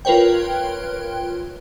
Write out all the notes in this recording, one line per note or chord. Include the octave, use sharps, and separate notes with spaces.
F4 A#4 B4 C#5 G5